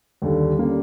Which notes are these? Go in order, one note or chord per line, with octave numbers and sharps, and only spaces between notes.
D#2 D3 G3
D3 G3 A#3 C#4